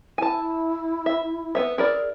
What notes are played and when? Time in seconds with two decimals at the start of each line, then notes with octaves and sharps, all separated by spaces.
0.18 E4 G#5 A5
1.06 E5
1.55 B3 C#5 E5
1.78 E4 G#4 A#4 D5